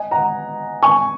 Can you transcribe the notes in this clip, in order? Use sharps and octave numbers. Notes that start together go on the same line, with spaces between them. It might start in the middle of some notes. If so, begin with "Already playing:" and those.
Already playing: D#5 G#5
F#5 A#5
G#5 C#6